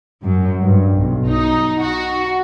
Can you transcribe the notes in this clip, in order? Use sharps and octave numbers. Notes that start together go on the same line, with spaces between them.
F#2
G2
B1
D#4
F#4